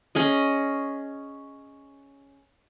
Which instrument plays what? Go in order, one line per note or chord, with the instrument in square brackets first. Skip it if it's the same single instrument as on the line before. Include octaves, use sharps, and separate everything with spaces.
[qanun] C#4 G#4 D#5